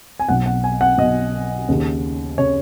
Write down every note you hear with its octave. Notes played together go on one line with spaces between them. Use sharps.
G#5
B1 B2 F#5
F#5
G#5
F#5
B1 B2 D#5
D#2 C#3
C#3 C#5